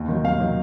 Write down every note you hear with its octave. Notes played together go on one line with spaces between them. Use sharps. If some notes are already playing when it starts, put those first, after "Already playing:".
Already playing: D#2
D#3 F#3
D#2 F5
D#3 F#3